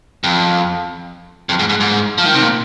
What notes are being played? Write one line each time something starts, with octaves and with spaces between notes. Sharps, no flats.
F2
F2
G#2
G#2
G#2
F3
D#3
C3
A#2